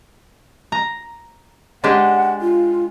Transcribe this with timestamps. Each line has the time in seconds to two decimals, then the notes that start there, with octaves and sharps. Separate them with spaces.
0.72 A#5
1.84 G#3 D4 G4 F#5
2.41 F4